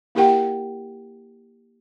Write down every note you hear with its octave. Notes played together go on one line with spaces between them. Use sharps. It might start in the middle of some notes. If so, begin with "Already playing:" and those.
A#3 E4 G4 A#4 F#5 G5